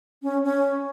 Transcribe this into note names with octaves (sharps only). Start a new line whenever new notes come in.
C#4
C#4